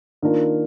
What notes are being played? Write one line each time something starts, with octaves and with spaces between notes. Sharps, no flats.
D#3 A#3 D4 F4 A#4